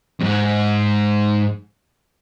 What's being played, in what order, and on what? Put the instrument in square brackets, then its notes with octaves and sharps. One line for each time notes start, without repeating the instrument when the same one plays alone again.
[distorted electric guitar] F2 G#2